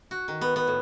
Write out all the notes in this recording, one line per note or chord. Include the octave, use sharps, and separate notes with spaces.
F#4
D#3
B3
B3
A2